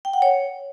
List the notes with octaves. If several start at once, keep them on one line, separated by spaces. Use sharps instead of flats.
G5
F#5
C#5